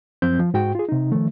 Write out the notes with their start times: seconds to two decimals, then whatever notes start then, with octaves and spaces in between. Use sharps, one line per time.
0.22 F#2 F3 C4 G6
0.39 F3
0.54 G#2 F#4 G5
0.75 F4 G#4
0.89 C3 D#4
1.12 D#3 F3 A3